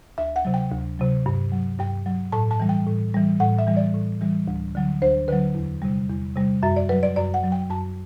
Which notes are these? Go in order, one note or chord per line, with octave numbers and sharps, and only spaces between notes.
D2 E5
F#5
C3 F#3
G5
D2
C3 F#3
G2
F#3
G2 G5
F#3
A2 A5
A5
E3 G3
G5
A2
E3 G3
A2 F#5
E5
E3 G3
D5
A2
E3 G3
D2
D3 F#3
D2 C5
D3 F#3 B4
E2
C3 G3
E2
C3 G3
F#2 E5
D5
F#3 B4
D5
F#2 D5
F#5
F#3
G5
F#2 A5